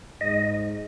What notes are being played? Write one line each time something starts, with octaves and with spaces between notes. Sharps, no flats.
G#2 D#5